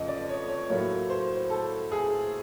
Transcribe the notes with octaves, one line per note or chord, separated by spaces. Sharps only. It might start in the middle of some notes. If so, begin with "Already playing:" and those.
Already playing: F2 C#3 F3 D#5
D5
C#5
C#5
A2 F#3 A#3 C#5
C5
A4
G#4